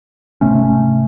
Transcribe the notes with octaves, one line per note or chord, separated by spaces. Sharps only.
G#1 C3 A3 C#4